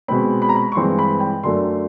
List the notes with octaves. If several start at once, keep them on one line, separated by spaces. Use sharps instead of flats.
B2 G#3 C4 B5
B5
A#5
B5
C#6
G2 E3 G#3 C4 C6
B5
G5
F#2 D3 F#3 A3 C6